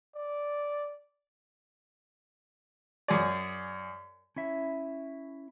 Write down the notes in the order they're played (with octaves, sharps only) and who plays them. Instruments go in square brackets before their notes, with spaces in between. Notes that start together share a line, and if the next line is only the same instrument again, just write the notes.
[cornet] D5
[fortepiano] F#2 G#4 D5
[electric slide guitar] C#4 E4 E5